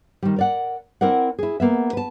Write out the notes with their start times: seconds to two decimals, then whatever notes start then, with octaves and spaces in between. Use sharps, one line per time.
0.23 D#3 G3
0.36 A#4 D5 F#5
1.01 C4 E4 A#4 D5 F#5
1.38 E4 G#4
1.60 A#3 B3 E5
1.93 B4 A5